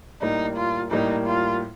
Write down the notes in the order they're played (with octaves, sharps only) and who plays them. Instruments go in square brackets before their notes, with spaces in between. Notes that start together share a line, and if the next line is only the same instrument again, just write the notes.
[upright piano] A2 G3 A#3 [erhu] D#4
[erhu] F4
[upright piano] A2 G3 A#3 [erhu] D#4
[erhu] F4